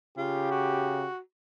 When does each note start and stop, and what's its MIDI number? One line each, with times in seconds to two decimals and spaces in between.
0.18 1.05 49
0.18 0.51 65
0.18 1.13 67
0.51 1.18 66